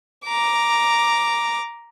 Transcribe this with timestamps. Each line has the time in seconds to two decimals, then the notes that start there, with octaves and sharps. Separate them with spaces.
0.25 A#5 D6